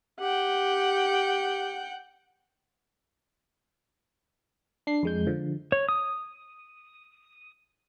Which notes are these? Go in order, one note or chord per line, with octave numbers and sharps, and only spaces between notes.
G4 F#5 G5
D4 C7
F2 G#3 G6
D3 F3
C#5
D#6